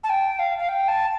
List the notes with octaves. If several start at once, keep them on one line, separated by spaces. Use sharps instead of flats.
A5
G5
F5
F5
G5
A5